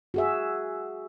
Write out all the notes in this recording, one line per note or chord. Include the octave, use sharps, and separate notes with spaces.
F#4 G#4 E5